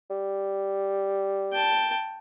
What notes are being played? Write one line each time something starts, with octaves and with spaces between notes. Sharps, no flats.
G3
G5 A5